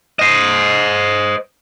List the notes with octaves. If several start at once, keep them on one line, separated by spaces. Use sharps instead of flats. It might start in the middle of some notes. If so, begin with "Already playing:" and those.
C5 D#5